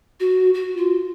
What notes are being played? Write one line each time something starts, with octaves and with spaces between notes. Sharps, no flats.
F#4
F#4
F4